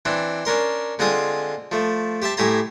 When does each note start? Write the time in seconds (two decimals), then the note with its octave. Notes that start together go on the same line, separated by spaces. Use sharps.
0.05 E3 C4 D4
0.45 C#4 D4 A#4 C6
0.99 D3 G#3 C4 F4 G#5 D#6
1.72 F3 A3
2.22 G4 C5 E5 A5
2.37 A2 G4 E5 G#5 A#5 C6